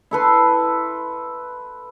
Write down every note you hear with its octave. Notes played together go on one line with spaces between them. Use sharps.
E4 A4 B4 C6